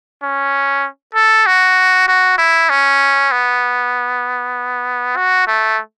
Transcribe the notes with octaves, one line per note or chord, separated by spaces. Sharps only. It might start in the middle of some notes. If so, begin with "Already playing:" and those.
C#4
A4
F#4
F#4
E4
C#4
B3
F#4
A3